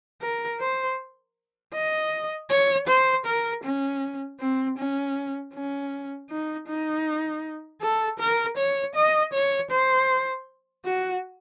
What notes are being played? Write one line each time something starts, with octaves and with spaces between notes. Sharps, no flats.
A#4
C5
D#5
C#5
C5
A#4
C#4
C4
C#4
C#4
D#4
D#4
A4
A#4
C#5
D#5
C#5
C5
F#4